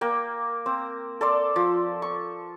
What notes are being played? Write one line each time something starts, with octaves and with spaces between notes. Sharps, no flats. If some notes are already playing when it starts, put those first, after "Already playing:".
A#3 G5
C4
A4 D5 C6
F3
C#6